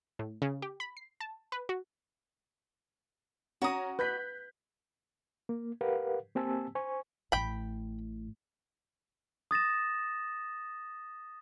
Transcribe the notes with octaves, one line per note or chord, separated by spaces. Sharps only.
A2
C#3
G4
B5
C7
A5
B4
F#4
C#4 F#4 A#5 D#6 A#6
B4 F#6 G6 B6
A#3
G4 A#4 B4 F5 F#5
A#3 C4 G4 G#5 A5 E6
C5 G#5 C#6
A1 A2 G5 B5
D#6 A6 A#6 E7